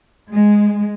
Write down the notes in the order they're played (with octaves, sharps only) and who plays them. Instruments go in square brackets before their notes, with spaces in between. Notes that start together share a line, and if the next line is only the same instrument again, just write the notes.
[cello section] G#3